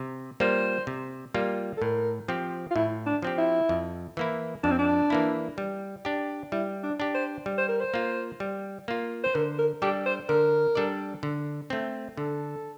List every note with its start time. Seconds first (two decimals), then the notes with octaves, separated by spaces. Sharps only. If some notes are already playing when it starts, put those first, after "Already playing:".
Already playing: C3
0.40 G3 A#3 F4 C5
0.87 C3
1.34 G3 A#3 F4
1.77 A4
1.82 A2 A#4
2.28 F3 C4 G4
2.71 F4
2.75 A2 E4
3.06 D4
3.22 F3 C4 G4
3.38 E4
3.69 F2
4.17 E3 A#3 E4
4.64 F2 D4
4.71 C4
4.79 D4
5.10 E3 A#3 E4
5.58 G3
6.05 D4 G4
6.52 G3 E4
6.84 D4
7.00 D4 G4
7.15 C5
7.46 G3
7.58 C5
7.69 A#4
7.81 C5
7.94 A#3 F4
8.40 G3
8.88 A#3 F4
9.24 C5
9.35 D3 A#4
9.59 A#4
9.82 G3 D4 G4 A4 D5
10.06 C5
10.29 D3 A#4
10.75 G3 D4 A4 D5
11.23 D3
11.70 A3 C4
12.17 D3 A4